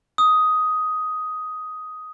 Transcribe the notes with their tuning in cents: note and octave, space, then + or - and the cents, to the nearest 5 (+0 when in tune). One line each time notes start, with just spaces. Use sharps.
D#6 +10